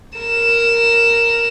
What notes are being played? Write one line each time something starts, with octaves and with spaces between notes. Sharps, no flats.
A#4 E7